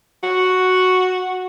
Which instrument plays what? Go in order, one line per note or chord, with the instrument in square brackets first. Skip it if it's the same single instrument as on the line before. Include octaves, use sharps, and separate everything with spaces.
[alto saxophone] F#4